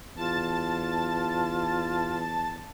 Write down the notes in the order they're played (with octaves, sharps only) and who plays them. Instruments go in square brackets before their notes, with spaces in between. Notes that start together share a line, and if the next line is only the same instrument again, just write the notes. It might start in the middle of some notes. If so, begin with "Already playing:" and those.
[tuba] E2 [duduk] F4 [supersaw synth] A5 A6